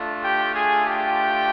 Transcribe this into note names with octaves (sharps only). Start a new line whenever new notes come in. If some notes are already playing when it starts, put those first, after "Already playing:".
Already playing: A3 D4 F4
G4 G5
G#4 G#5
G4 G5